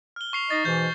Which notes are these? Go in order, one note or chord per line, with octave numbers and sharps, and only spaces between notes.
F6 G7
C#6 C7 F7
D#4 D#5 A6 C7
G#2 B2 E3 G6